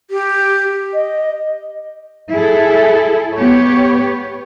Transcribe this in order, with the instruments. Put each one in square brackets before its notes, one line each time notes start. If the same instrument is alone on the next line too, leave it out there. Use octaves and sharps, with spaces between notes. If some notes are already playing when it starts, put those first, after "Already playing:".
[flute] G4
[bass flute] D#5
[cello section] E4 G#4 A4
B3 G4 C#5